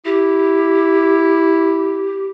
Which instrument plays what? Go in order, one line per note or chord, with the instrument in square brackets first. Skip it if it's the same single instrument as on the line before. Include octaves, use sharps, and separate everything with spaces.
[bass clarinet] E4 [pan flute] G4